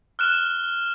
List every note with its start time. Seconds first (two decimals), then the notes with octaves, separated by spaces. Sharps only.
0.19 F6 F#6 E7 G7